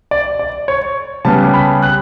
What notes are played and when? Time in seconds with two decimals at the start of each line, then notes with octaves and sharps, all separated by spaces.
0.11 D5
0.39 D5
0.68 C#5
1.25 C#3 G3 B3 A5
1.54 B5
1.83 F#6